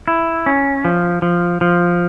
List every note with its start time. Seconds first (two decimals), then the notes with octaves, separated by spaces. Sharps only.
0.08 E4
0.46 C#4
0.85 F3
1.22 F3
1.61 F3